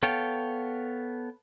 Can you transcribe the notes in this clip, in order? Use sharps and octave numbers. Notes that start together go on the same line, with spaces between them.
B3 A4 C#5 F5 G5